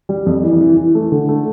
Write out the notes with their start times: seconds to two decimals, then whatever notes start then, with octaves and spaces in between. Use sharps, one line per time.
0.09 G3
0.26 F2
0.43 E3
0.61 E3
0.77 E3
0.95 A3
1.12 D3
1.29 A3